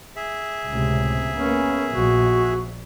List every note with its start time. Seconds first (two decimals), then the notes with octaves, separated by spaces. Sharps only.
0.16 G#4 E5
0.70 C#2 A2 C3
1.38 A#3 B3 C#4
1.93 A#1 F#4